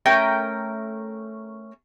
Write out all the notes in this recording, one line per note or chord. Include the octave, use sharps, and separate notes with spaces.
A3 C#4 A#4 G5